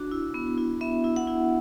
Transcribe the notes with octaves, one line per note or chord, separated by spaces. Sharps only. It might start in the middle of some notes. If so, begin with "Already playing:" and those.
Already playing: D4 F#4
E4
B3
E4
B3 E5
E4
F#5
E4